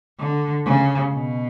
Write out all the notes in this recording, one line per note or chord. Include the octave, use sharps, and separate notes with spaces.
D3
C#3
B2